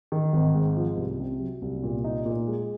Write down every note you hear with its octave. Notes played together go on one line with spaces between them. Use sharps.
D#3
G#1
G#2
F3
C2
C3
F#3
C2
A#2
D#4
A#2
G#3